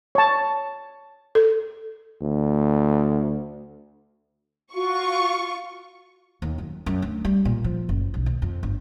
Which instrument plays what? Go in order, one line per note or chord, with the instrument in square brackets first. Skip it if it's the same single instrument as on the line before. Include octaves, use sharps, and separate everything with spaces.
[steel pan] C#5 A5
[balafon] A4
[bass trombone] D2
[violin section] F4 C#6 [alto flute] F#4
[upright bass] D#2
F#2
F#2
D2
G3
A#2
F3
F#1
B1
D#2
F2
G1